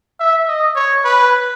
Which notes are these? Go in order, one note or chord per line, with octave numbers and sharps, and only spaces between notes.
E5
D#5
C#5
B4